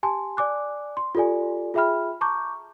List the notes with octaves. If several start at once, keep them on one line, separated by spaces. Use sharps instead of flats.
G4 G#5 A5 C6
D5 G#5 D6 F#6
C6
F4 G4 A4 D5 G#5
F4 G#4 E5 G5 B5 F6
A5 A#5 C#6 D6 G6